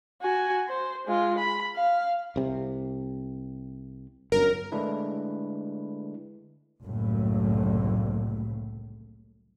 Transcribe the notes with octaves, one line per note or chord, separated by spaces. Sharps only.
F#4 G#5
C5
G#3 F4
B5
F5
C2 C3
G1 F#2 A#4
D3 G#3 A3 D4 E4 B4
F#1 C2 A2